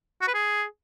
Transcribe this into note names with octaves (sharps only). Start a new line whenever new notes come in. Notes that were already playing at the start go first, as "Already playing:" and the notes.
F#4
B4
G#4